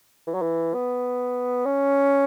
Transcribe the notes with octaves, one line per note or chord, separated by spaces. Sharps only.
E3
F#3
E3
B3
C#4